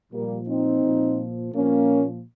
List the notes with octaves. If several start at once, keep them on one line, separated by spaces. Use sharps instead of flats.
A#2 F3 G3 A#3
C4 D#4
A#2 F3
A#2 F3 A#3 C#4